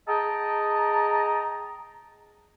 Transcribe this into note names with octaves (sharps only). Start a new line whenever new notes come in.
G#4 D#5 G5 A5 A#5